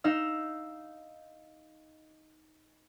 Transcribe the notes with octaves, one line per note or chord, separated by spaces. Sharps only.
D#4 F5 E6